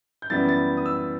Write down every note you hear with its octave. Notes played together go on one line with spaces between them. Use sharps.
G6
F#2 E3 G3 B3 E4 A6
A6
D#6
E6